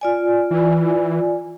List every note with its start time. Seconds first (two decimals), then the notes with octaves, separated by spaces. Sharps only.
0.01 F4 D5 G#5
0.51 E3